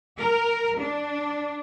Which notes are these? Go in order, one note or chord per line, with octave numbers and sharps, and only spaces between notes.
A#4
D4